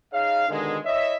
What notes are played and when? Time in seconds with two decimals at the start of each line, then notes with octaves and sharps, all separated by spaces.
0.12 D#4 G#4 C#5 F5
0.49 G#2 B2 D3 D#3 G#3
0.85 E4 C#5 D#5 E5